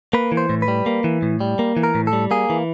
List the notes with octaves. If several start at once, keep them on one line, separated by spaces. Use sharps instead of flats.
A#3 B4
E3
C5
A2
B4
G3
A#3
E3
A2
G3
A#3
E3
A#4
A2
A4
G3
A#3 G#4
E3